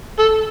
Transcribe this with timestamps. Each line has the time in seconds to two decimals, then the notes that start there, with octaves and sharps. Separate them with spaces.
0.19 A4